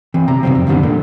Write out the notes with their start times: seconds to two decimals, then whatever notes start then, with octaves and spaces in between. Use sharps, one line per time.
0.14 E3 C4
0.28 C3 A#5
0.43 C3 D#3 E3 G3 C4
0.55 F2
0.67 F2 A2 D3 D#3 G3 B3
0.83 A#2 D3